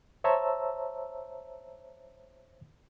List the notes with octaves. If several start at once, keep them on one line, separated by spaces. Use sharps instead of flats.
C5 C#5 E5 A5 A#5 E6